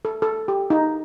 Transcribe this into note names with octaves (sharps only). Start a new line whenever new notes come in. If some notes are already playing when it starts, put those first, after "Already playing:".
A4
A4
G4
D#4